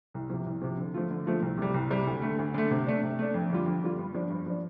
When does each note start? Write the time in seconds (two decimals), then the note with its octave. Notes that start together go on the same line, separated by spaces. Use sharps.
0.14 C2
0.30 C3 F3
0.46 C2
0.62 C3 F3
0.78 D3
0.94 F3 A3 F4
1.11 D3
1.26 F3 A3 F4
1.42 C2
1.58 C3 G3
1.74 C2
1.90 C3 G3
2.07 D2
2.22 D3 A3
2.39 D2
2.54 D3 A3
2.71 C3
2.87 A3 D4
3.03 C3
3.19 A3 D4
3.34 F2
3.50 D3 G3 F4
3.66 F2
3.83 D3 G3 F4
3.99 G2
4.15 F3 D4
4.30 G2
4.46 F3 D4